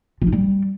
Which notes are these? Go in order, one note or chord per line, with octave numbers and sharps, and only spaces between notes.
F3
D#4
G3